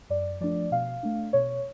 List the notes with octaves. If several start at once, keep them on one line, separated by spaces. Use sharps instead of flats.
F#2 D5
F3 A3 D4 D5
B2 F5
A3 D4
B2 C#5